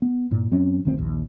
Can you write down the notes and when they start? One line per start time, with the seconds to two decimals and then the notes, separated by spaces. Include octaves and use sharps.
0.02 B3
0.31 G2 A#2
0.51 F#2 F#3 C4 C#4
0.85 F1 D2 D#3 C4
0.97 A#1 D#2